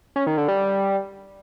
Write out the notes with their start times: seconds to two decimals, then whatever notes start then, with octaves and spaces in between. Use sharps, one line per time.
0.16 C#4
0.27 D#3
0.37 D3
0.48 G3